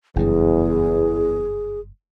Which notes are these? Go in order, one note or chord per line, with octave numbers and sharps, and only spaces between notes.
F#1 E2 G2 G#4